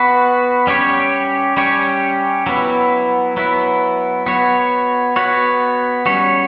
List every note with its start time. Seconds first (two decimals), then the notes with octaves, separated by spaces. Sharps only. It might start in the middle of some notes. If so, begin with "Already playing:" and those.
Already playing: B3 F#4 B4
0.67 G3 C#4 G4 C#5
1.57 G3 C#4 G4 C#5
2.47 F#3 B3 E4
3.37 F#3 B3 E4
4.26 B3 F#4 C#5
5.16 B3 F#4 C#5
6.06 G3 C#4 F#4 C#5